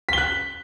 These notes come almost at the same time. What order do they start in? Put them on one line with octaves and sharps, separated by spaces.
B6 G7 F#6